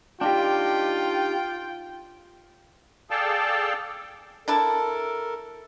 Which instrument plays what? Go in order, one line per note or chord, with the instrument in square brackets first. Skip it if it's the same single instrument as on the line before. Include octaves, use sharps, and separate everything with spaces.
[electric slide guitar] D4 D#4 G4 [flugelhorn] F4 [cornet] G5
[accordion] G#4 A4 D5 F5 G5 A5
[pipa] D4 E4 A5 [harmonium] A4 A#4